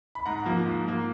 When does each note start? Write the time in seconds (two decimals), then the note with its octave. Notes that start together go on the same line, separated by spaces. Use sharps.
0.15 B5
0.26 G#2 F#5 A#5
0.45 F3 A#3
0.66 G#2
0.85 F3 A#3